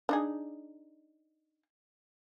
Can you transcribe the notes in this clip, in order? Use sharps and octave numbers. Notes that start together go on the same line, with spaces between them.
D4 D#4 G#4